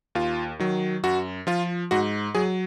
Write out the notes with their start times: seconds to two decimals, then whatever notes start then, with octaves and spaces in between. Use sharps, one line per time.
0.15 D#2 F4
0.59 D#3 F#3
1.03 F#2 F#4
1.47 F3 F4
1.91 G#2 F#4
2.35 F#3 G#4